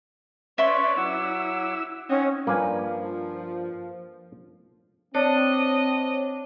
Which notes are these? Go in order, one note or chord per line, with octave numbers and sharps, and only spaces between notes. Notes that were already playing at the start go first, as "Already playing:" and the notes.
C#4 B4 C#5 D5 E5 C6
F#3 E4 F#5 D6 E6
C4 C#4 D#4 C#5 F#5 D#6
G2 F3 A#3 B4 G#5
C4 D4 C#5 D#5